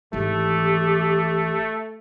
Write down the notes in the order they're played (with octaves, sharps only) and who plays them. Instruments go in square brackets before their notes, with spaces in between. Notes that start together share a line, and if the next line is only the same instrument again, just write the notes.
[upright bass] G#1 E3 [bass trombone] A3 [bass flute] G4